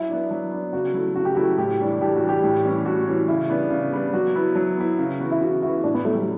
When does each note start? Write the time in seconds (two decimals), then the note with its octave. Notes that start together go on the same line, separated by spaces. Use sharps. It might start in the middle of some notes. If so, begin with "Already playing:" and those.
Already playing: F#3 E4
0.09 B3 D4
0.30 F#3
0.52 B3 D4
0.73 C#3 F#4
0.94 F#3 A3 E4
1.15 C#3 F#4
1.25 G4
1.34 F#3 A3 E4 F#4
1.58 A2 G4
1.80 E3 G3 D4
2.01 A2 G4
2.15 F#4
2.22 E3 G3 D4
2.29 G4
2.44 A2
2.64 E3 G3 C#4
2.85 A2 F#4
3.07 E3 G3 C#4
3.28 C#3 E4
3.49 G3 B3 D4
3.70 C#3
3.92 G3 B3 D4
4.13 F#3 F#4
4.35 B3 E4
4.55 F#3
4.77 B3 E4
4.99 C#3
5.20 E3 B3 F#4
5.31 E4
5.41 C#3 F#4
5.62 E3 B3 E4 F#4
5.84 A2 D4
5.94 B3
6.05 F#3 A3 C#4
6.15 G3